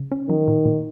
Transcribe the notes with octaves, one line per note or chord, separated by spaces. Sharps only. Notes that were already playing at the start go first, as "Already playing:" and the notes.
Already playing: C#3
C#4
D#3 F#3
A#2
A#2